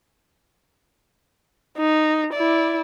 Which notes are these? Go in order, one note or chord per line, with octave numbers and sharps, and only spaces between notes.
D#4
E4 D5